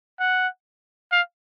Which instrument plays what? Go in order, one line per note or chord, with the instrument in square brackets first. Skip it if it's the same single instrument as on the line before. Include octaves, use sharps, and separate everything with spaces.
[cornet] F#5
F5